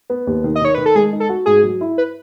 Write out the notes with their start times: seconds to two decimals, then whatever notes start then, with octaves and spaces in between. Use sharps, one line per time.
0.10 B3
0.27 D#2
0.44 D#3
0.56 D#5
0.61 D#3 C#5
0.75 D#3 B4
0.86 A4
0.95 G#3 G#4
1.13 D#4
1.20 A4
1.29 F#4
1.46 G#2 G#4
1.64 F#3
1.81 E4
1.98 B4